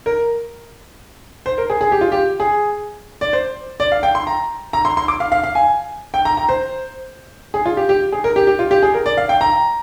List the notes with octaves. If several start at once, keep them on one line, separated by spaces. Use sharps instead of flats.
A#4
C5
A#4
G#4
G#4
G4
F4
G4
G#4
D5
C5
D5
F5
G5
C6
A#5
A#5
C6
C6
D6
F5
F5
F5
G#5
G5
A#5
A#5
C5
G#4
F4
G4
G4
G#4
A#4
G4
G4
F4
G4
G#4
A#4
D5
F5
G5
A#5